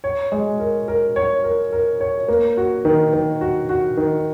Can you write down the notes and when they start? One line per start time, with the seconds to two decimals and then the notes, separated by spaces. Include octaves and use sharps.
0.04 C#5
0.32 G#3
0.60 A#4
0.88 A#4
1.16 C#5
1.44 A#4
1.72 A#4
2.01 C#5
2.28 A#3
2.57 F#4
2.85 D#3
3.13 D#3
3.41 F#4
3.69 F#4
3.97 D#3